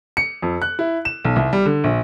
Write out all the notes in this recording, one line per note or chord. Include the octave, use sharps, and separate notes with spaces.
C#7
F2
F#6
E4
E7
B1
C2
G3
D3
A#1